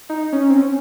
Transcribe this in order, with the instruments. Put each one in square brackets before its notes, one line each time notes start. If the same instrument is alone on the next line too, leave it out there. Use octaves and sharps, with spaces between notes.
[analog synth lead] D#4
C#4
C4
C#4